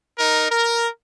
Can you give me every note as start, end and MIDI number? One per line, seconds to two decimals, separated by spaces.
0.19 0.49 63
0.19 0.49 70
0.50 0.88 70